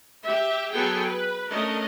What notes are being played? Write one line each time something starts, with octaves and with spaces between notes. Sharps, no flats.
G4 E5
F#3 B3 G#4 A4 G5 G#5
B4
A3 C#4 D4 A#4 D#5